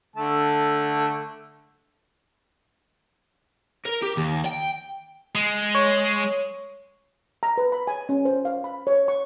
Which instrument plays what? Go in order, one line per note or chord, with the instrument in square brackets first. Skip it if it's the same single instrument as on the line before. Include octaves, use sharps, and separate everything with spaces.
[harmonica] D3 A3 A5
[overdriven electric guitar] A#4
G4
D#2
G5
[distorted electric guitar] G#3
[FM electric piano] C#5
[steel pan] A#5
B4
B5
G#5
C#4
C5
F5
B5
C#5
C#6